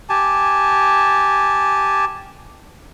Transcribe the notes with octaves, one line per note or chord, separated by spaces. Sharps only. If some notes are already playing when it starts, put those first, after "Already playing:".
G4 G#5 A5